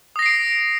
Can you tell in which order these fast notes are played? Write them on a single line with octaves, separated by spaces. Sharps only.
D#6 A#6 C7 D7